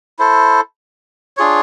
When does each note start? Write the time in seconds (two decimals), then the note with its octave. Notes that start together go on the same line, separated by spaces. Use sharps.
0.19 E4 A4 C5
1.37 D4 F4 G#4 C#5